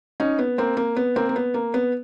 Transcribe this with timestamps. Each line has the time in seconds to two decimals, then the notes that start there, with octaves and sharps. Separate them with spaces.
0.20 C#4 D#4
0.39 B3
0.58 A#3 C4
0.77 A#3
0.97 B3
1.16 A#3 C4
1.29 A#3
1.36 B3
1.54 A#3
1.74 B3